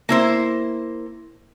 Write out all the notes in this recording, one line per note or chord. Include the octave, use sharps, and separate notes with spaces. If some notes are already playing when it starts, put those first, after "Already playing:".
A#3 E4 C5